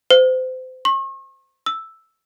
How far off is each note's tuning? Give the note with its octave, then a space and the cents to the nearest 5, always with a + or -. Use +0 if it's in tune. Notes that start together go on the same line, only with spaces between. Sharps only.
C5 -30
C#6 -45
E6 +0